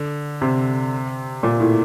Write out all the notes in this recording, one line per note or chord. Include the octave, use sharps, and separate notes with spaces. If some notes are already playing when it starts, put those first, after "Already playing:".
Already playing: D3
C3
A#2
A2